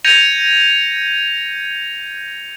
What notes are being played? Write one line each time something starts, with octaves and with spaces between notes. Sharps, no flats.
G6 G#6 A#6 C#7 D#7 F7